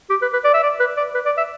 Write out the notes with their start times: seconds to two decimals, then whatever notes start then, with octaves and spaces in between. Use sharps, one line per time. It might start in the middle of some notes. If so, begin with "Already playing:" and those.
0.10 G4
0.22 B4
0.33 B4
0.44 D5
0.54 E5
0.63 D5
0.80 B4
0.97 D5
1.15 B4
1.25 D5
1.37 E5